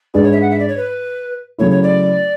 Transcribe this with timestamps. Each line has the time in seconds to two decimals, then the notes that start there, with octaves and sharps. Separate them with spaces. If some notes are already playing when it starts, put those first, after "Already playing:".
0.14 G#2 G#3 D4 G#4 B4 D5
0.23 C#5
0.32 E5
0.41 F#5
0.50 E5
0.59 D5
0.68 C#5
0.77 B4
1.58 C#3 F#3 A3 E4 C#5
1.70 C#5
1.82 D5